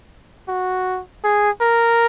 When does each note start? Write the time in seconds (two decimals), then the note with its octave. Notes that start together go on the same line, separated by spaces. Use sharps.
0.48 F#4
1.24 G#4
1.61 A#4